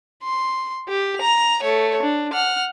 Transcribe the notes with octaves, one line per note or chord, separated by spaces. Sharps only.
C6
G4
A#5 F7
A3 C#5
D4
F#5 F6